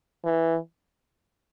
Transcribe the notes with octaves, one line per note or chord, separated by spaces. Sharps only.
E3